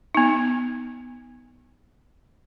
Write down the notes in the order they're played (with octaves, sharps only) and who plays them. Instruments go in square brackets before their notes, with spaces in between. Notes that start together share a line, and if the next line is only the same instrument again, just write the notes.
[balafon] B3 D#4